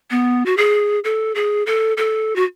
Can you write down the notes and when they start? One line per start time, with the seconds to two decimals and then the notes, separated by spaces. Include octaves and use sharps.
0.10 B3
0.46 F#4
0.57 G#4
1.04 A4
1.35 G#4
1.66 A4
1.97 A4
2.36 F#4